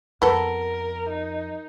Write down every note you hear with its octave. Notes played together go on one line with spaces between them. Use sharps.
F2 B3 A4 A#4
D#4